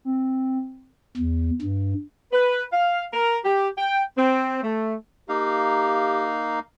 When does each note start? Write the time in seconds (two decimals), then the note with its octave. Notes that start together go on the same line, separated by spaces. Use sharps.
0.05 C4
1.17 E2
1.62 G2
2.32 B4
2.73 F5
3.13 A#4
3.45 G4
3.78 G5
4.17 C4
4.63 A3
5.29 A#3 D#4 G4 F5